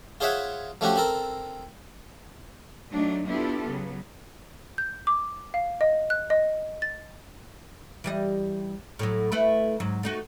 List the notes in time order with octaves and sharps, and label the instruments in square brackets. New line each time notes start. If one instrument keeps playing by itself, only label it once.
[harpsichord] F4 G#4 C5 C#5 E5 F#5
F3 A3 C#4 F#4 G4
C4 A4 A#4
[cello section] F#3 A3 D4 D#4
B3 D4 E4 F4 G4 A4
C#3 F#3 B3
[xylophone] G6
D6
F5
D#5
F#6
D#5
A6
[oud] E3 G3 D#5
A2 F#3
A3 E4 B4
G#2 F#3
A3 D#4 F#4